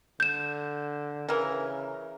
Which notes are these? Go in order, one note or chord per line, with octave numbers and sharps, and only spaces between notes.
D3 G6 E7
C#3 E3 A#4